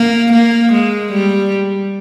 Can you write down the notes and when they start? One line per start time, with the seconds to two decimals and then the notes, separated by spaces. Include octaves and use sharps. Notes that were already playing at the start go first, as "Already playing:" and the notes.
Already playing: A#3
0.33 A#3
0.72 G#3
1.12 G3